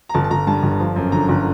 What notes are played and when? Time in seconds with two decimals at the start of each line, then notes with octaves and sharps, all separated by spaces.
0.09 A#5
0.14 G1 A5
0.24 A5
0.30 G1 A#5
0.47 G2 A5
0.63 G1
0.80 F3
0.96 F#2
1.12 D3 A#5
1.29 G1